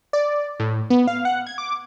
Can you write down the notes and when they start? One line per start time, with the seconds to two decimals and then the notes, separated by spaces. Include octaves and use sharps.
0.13 D5
0.60 A2
0.90 B3
1.08 F5
1.25 F#5
1.47 G#6
1.58 D6